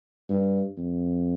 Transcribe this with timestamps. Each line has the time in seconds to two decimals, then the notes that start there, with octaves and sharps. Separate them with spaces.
0.30 G2
0.78 F2